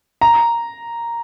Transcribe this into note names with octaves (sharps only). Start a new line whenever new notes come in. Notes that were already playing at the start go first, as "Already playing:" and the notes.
A#5